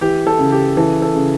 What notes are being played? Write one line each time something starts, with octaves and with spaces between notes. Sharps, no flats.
E3 G4
A4
C#3
G4
E3 A4
A4
C#3